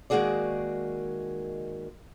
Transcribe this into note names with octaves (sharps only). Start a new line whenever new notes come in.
D#3 G#3 A#3 F#4 G#4 D5